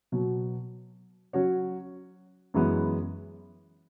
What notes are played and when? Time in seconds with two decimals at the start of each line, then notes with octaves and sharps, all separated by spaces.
0.12 B2 F#3 B3
1.33 F#3 C#4 F#4 C#5
2.54 F#2 E3 G#3 B3